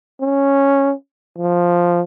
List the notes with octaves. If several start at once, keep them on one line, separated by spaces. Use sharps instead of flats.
C#4
F3